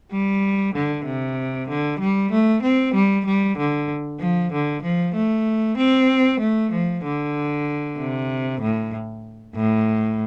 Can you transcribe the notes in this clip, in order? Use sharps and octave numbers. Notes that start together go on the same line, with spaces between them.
G3
D3
C3
D3
G3
A3
C4
G3
G3
D3
F3
D3
F3
A3
C4
A3
F3
D3
C3
A2
A2